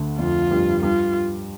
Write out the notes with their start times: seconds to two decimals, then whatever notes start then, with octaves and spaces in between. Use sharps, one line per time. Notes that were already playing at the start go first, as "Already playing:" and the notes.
Already playing: D2 D3
0.18 F2 F3 F4
0.51 G2 G3
0.83 G2 G3 F4